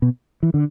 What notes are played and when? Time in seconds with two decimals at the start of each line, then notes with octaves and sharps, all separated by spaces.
0.02 B2
0.43 E3
0.54 D3